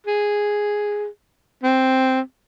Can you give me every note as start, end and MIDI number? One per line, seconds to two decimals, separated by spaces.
0.07 1.06 68
1.63 2.20 60